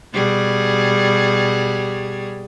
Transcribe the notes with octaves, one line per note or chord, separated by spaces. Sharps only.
B2 G3 G#4